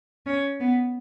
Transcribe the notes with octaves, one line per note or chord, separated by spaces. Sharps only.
C#4
B3